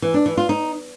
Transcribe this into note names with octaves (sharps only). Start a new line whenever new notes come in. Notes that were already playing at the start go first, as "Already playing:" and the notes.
E3
D4
E3
F4
D#4